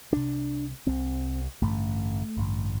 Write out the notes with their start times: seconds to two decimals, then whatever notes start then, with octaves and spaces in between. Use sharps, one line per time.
0.12 C2 C3 D4
0.86 C2 C3 C4
1.62 A1 G2 D3 A3
2.36 A1 G2 D3